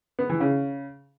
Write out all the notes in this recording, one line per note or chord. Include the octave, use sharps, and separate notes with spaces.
B3
E3
C#3